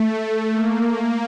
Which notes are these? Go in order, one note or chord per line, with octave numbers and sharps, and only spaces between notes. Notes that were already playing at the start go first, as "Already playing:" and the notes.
Already playing: A3
A#3